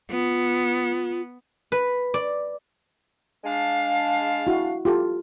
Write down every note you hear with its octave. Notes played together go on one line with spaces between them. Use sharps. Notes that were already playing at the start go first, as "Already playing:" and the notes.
B3 F4
B4
D5
G#3 D4 F5
E4 F#4
F4 G4 A4